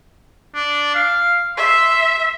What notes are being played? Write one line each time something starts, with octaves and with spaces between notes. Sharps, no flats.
D4
F5
E5 C6